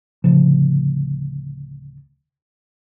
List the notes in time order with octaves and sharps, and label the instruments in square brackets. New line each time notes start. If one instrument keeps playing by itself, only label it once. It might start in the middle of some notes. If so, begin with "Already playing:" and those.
[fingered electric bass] D1 D2 C#3 F3